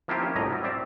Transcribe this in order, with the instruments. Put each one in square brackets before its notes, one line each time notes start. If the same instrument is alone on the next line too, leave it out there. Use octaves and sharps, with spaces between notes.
[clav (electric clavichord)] F3 A#3 C4 E4 F4 G4
C#4
C2 A2 D#5 A#5
F#3 G3
C4 D5 E5